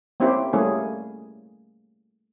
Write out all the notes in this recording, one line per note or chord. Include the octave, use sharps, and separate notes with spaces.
A#3 C4 C#4 E4 G4 C5
G3 A3 A#3 C#4 E4 G#4